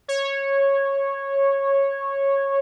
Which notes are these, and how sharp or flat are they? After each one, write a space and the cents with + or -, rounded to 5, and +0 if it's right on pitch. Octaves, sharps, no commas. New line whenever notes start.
C#5 -10